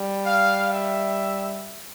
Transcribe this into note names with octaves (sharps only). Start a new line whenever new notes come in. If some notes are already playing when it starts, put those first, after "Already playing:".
Already playing: G3
F5
E5